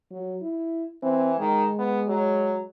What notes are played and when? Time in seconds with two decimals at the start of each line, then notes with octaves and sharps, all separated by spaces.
0.11 F#3
0.42 E4
1.03 E3 C4
1.39 D#3 G#3
1.79 B3
2.08 F#3